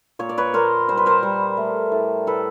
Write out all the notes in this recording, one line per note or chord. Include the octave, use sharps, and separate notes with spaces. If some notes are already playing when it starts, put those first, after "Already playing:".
A#2 C#5
D5
B4 C#5
A#2 A#4 C5
G3 C5
B4
A#4 C5
G3
A3
A2
A2 A4 B4